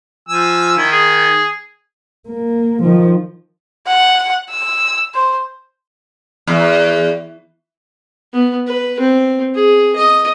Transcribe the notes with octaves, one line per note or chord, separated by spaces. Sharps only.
F3 G#5 E6
D#3 E4
G#4
A#3
D#3 F3
F#5
E6
C5
E2
B3
B4
C4
G#4
D#5